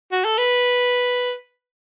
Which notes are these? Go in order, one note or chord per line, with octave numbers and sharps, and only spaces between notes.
F#4
A4
B4